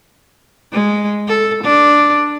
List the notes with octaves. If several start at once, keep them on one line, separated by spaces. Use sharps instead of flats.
G#3
A4
D4